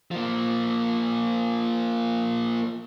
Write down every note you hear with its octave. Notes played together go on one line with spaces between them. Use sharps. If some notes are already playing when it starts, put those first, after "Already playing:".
F3 A#3